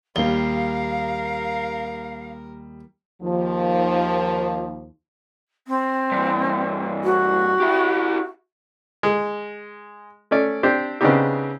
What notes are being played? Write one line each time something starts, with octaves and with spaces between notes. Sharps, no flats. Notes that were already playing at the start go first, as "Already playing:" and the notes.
D#2 G3 A#4 F5 G7
D#2 F3
C4
G2 E3
F#4
E4 G4
G#3
A3 C#4 D5
C4 D4 G4 C5
C#3 B3 C4 D4 D#4 G4